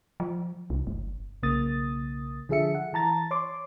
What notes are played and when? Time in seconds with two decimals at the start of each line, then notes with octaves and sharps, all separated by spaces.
0.20 F3
0.70 C2
0.87 G1
1.43 B1 C#3 A#3 D#6 A6
2.49 D3 F3 G#4 A4 E5 C#7
2.75 F#5
2.93 E3 A5 A#5 A6
3.31 C#5 C6 D6